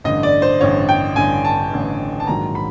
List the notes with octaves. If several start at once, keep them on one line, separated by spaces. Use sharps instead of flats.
A1 G2 D3 D#5
D5
C5
A1 G2 D3 C#5
G5
A1 G2 D3 G#5
A5
A1 G2 D3
A5
A#1 G#2 D#3 F#3 A#5
B5